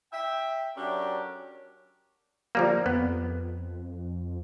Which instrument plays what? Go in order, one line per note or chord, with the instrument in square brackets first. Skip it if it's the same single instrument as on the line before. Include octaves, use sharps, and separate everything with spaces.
[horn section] E5 G5
F#3 C#4 D4 G4 A4 A#4
[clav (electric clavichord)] F3 G3 A#3
[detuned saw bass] F2 [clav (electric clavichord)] B3